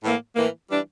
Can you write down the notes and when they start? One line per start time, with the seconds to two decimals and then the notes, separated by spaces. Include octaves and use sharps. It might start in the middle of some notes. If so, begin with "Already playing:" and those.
0.02 A2 E3 A#3
0.35 A2 E3 A#3
0.69 E3 G3 D4